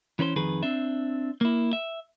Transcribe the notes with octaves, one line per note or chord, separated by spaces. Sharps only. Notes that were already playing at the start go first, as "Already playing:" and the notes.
E3 C#4 B4 C5
F2 D#3 G#4 B4
C4 D4 E5
A#3 E4
E5